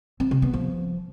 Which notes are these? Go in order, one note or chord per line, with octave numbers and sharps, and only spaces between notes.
C4
C3
B3
F3